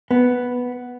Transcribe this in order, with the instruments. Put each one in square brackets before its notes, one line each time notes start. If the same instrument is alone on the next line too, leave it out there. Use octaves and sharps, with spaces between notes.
[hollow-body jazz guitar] B3